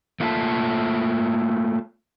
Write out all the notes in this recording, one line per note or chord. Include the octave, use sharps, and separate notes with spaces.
A3 A#3 F4 E5 G#5 A5